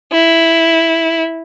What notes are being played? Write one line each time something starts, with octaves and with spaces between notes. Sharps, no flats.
E4